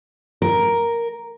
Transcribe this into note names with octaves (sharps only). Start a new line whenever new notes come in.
A#4